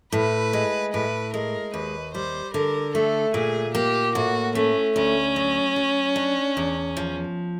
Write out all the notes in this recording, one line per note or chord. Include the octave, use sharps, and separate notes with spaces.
A2 B4
G#3
A2 B4
G#3 A#4
D#2 B4
G3 C5
D3 A#4
A3 A4
A#2 G#4
A#3 G4
A2 F#4
A3 C#4
D2 C#4
F#3
F#3
D4
E2
F3